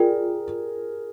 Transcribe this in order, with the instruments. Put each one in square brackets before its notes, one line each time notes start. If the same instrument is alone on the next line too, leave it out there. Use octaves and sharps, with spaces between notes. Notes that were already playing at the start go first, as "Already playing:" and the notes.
Already playing: [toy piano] F4 D5 G5 [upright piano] G#4 A#4